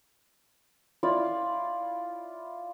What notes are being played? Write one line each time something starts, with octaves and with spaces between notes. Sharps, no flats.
E4 F4 D5